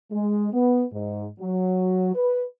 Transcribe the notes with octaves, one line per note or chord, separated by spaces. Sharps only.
G#3
B3
G#2
F#3
B4